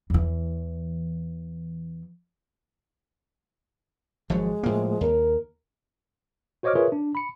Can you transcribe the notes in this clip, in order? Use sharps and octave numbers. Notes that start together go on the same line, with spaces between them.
E2 E3
G#1 F3 F#3 G#3
A2 F3 A#3
D#2 A#4
F#4 C5 C#5 D#5 D6 F6
F4 G#4 A#4 B4 C#5 E5
D4
B5 C#7